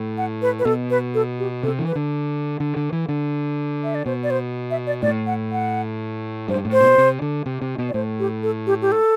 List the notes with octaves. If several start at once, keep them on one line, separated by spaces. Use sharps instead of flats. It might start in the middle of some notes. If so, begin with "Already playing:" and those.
Already playing: A2
F#5
B4
B4
B2 A4
B4
A4
G4
C3 A4
E3
B4
D3
D3
D3
E3
D3
E5
D5
B2 C5
D5
C5
E5
D5
A2 D5
F#5
F#5
G2 C5
A2
C5
B2
C3
D3
C3
C3
B2
D5
A2 C5
G4
A4
G4
G4
A4